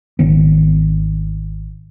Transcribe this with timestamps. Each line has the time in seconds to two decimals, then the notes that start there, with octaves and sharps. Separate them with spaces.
0.19 G#1 D#3 B3